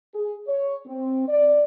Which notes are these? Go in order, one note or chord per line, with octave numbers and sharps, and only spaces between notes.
G#4
C#5
C4
D5